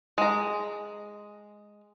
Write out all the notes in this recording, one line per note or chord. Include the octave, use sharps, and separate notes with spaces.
G#3 A#5